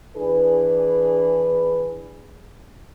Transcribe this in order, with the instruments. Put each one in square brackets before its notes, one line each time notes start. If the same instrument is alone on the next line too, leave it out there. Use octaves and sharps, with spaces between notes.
[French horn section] E3 D4 G#4 B4